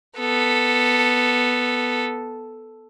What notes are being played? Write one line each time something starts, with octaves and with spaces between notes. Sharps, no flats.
B3 A4